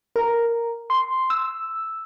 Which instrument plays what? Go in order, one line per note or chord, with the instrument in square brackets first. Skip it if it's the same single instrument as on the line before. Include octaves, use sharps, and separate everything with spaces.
[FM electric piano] A#4
C6
E6